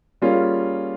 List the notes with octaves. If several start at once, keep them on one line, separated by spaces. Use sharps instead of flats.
G3 A#3 C#4 F4 G#4